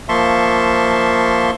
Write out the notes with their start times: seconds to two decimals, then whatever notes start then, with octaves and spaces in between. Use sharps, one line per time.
0.09 F3 A#3 E5 A5 C6 C#6